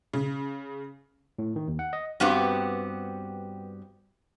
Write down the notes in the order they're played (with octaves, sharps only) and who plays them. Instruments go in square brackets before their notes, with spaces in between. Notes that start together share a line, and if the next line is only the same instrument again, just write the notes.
[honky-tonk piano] C#3
[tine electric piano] A2
D#3
D#2
F#5
D#5
[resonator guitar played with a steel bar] G2 B3 C4 F#4 G4